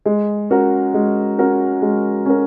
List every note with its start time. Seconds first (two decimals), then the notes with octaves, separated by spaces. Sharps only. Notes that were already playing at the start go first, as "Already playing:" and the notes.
0.06 G#3
0.50 C#4 F#4 A#4
0.94 G#3
1.38 C#4 F#4 A#4
1.82 G#3
2.26 C#4 F#4 A#4